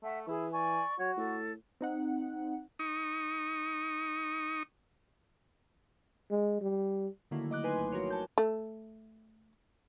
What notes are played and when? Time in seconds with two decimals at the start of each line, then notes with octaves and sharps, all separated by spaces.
0.02 A3 E5 F#5
0.27 E3 E4 G#4
0.53 D5 G#5 C#6
0.99 F#3 F#4 C#5
1.17 A2 A4
1.81 C4 D#4 F#5
2.79 D#4 C#6 D#6
6.30 G#3
6.61 G3
7.31 D3 D#3 F#3 A3 A#3 E4
7.51 D#5 D6 F#6
7.64 D#4 B4 G#5 C6
7.78 G#1
7.92 F3 F#4 A#4 C#5
8.10 A5 G6
8.38 A3